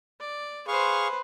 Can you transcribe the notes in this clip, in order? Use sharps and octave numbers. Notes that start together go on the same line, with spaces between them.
D5
G#4 B4 C5 F5 C#6